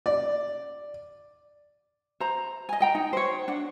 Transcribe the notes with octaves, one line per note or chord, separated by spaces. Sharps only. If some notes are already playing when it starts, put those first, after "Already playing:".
D5
C5 A#5
D#5 G#5
D#5 G5 A#5
D#4
C5 C#5
D4 F#5